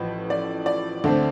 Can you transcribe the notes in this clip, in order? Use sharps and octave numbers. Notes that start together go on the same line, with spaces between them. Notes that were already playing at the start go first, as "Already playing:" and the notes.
Already playing: A1 A2 F3 B4
D5
D5
D2 D3 A3 C4